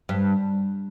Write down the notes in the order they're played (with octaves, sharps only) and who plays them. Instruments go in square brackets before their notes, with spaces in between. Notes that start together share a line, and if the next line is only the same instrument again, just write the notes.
[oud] G2